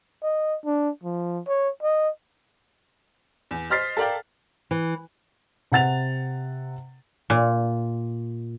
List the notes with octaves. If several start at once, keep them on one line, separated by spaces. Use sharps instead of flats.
D#5
D4
F3
C#5
D#5
E2
C5 D#5 F6 A6 B6 C7
A4 A#4 D5 F5 G5
E3
C3 F#5 A6 F7
A#2